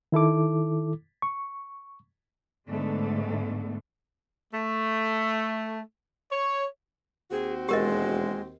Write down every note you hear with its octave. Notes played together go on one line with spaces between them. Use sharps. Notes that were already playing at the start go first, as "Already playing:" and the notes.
D#3 E4 A4 D6
C#6
G#2 D3 G#3 A3 B3
A3
C#5
D#2 C4 F#4 G#4
E1 G#3 G4 A#4 D#5